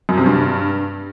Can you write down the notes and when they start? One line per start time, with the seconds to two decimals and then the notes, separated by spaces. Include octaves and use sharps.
0.09 F#2
0.17 C3
0.26 G2